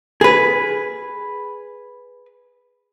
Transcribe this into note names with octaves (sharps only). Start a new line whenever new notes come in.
G#4 B4